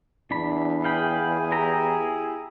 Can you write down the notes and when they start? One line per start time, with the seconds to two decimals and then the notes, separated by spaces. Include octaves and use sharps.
0.31 E2 D4 B5
0.84 G#4 F5 G5 B5
1.52 E4 G4 A#5